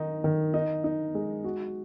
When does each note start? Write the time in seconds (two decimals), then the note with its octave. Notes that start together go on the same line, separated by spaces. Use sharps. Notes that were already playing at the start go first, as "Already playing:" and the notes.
Already playing: D#3 D#4
0.24 D#3
0.54 D#4
0.84 D#4
1.15 G#3
1.44 F#4